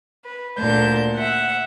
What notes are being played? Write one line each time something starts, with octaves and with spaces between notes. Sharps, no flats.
B4
D2 A#2 A5 G6
E5 F#5